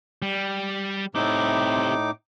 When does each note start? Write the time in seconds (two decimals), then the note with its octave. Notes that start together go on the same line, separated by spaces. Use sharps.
0.22 G3
1.15 A2 C3 D#4 E4 D6